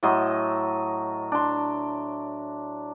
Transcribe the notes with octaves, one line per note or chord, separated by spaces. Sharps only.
A2 F#3 D#5 C6
D4 C6